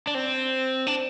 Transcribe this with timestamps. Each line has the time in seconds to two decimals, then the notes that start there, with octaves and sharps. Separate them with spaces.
0.07 D4
0.15 C4
0.87 D4